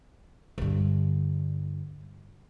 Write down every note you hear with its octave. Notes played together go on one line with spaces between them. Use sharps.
G2 D3